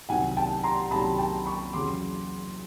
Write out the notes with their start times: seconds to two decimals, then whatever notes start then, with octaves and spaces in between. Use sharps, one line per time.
0.09 C2 C3 D#3 F#3 F#5 G#5
0.37 G5 A5
0.64 A#5 C6
0.91 C2 C3 D#3 F#3 A5 B5
1.18 G5 A5
1.46 B5 C#6
1.73 E2 C#3 F#3 C6 D6